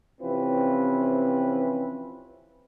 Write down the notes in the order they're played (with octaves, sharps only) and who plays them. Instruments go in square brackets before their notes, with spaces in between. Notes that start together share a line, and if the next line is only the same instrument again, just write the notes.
[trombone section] C3 E3 F3 C4 C#4 B4